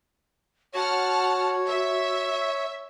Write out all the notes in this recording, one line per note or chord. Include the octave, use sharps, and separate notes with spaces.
F#4 C#5 F#5 A5 F6
E5